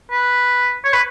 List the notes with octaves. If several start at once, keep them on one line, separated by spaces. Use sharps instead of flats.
B4
C#5
B4